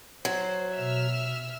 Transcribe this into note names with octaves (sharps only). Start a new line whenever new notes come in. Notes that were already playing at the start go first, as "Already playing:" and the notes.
F#3 C5
B2 E5 E6 F6